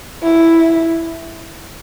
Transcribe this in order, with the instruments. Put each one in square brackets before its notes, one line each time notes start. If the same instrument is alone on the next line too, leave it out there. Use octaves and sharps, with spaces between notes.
[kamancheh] E4